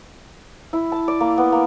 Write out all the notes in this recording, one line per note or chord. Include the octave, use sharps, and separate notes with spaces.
E4
A5
D5
A#3
B3
A#3